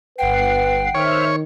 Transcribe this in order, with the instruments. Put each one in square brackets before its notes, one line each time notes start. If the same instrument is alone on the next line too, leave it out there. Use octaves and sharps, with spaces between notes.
[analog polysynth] G1 F#5 C7 [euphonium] B4 [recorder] G5
[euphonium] D#3 [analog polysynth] C5 E5 F6 [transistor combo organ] C#5